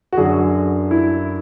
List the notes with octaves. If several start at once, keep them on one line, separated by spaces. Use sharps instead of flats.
F#4
F#2 D3 G#4
E4